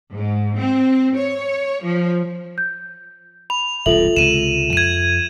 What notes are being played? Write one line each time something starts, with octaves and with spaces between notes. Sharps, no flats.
G#2
C4
C#5
F3
G6
B5 F7
E1 C2 G2 F4 A4 E5 F#7
C#2 C3 G#3 D#7 E7
F2 G#6 D#7